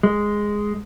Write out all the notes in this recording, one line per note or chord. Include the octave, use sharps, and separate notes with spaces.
G#3